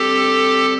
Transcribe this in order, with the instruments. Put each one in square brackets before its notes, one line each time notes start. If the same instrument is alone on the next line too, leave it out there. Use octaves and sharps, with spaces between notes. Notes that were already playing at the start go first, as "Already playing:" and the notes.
Already playing: [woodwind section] D2 D3 G3 C4 [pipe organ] G4 A4